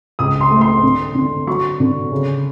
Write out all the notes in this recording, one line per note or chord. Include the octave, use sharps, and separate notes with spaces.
C#2 D#6
C6
A3
C6
D3
D3
F#3 C#6
D3
C#3